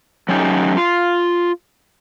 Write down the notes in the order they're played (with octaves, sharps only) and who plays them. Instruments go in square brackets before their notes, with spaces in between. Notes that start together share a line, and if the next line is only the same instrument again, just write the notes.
[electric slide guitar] F#3 A3 C#4 D#4 G4
F4